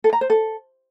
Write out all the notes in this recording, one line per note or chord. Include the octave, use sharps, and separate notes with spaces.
A4
A#5
C5
A4